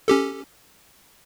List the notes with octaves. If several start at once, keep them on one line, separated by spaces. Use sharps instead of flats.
C#4 G4 A4